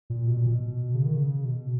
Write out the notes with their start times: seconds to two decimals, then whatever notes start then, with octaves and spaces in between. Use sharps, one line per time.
0.10 A#2
0.27 B2
0.37 A#2
0.46 B2
0.94 C#3
1.05 D#3
1.16 C#3
1.45 B2